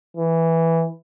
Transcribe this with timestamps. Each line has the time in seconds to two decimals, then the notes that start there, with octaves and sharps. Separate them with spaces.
0.17 E3